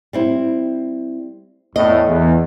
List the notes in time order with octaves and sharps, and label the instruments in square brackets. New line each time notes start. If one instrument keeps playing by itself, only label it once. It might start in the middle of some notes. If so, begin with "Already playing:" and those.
[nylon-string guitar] G3 C4 E4
[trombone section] E2 A2 [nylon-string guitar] D#5
[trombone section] E2